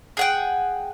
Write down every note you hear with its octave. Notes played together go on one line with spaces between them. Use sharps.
G#4 F#5 G5